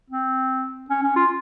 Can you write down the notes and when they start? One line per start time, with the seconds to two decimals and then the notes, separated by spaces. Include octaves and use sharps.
0.10 C4
0.90 C#4
1.03 C#4
1.16 F4